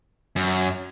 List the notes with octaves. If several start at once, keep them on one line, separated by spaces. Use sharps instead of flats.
F#2